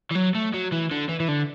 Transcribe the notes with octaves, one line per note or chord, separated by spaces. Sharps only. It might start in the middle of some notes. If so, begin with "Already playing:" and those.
E3
F#3
A3
F#3
E3
D3
E3
E3
D3